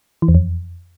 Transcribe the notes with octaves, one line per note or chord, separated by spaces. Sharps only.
E3
E2
F2